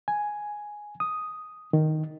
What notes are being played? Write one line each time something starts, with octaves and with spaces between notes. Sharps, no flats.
G#5
D#6
D#3